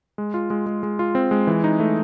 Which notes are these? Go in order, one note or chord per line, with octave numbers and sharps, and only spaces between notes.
G#3
F4
G#3
G#3
G#3
F4
C4
G#3
E3
D#4
A3